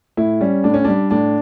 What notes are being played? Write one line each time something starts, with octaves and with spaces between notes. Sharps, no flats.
A2 E4
G3 C#4
A2 D4
C#4
G3 D4
A2 D4